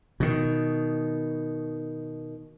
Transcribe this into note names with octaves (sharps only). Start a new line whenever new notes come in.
B2 D#3